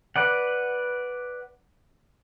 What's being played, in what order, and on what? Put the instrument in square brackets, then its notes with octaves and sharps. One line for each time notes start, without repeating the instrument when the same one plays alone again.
[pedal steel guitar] B4 D5 F#5